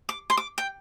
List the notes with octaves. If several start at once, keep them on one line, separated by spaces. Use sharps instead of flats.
D6
C6
D6
G5